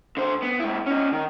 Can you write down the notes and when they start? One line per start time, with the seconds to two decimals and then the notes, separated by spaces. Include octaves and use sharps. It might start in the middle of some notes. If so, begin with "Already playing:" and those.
0.17 D3 C5
0.42 B3
0.60 G#2 E4
0.86 C#4 D#4
1.13 D#3